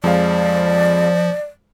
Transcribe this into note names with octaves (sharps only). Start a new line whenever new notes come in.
F2 F3 G#3 D5 F5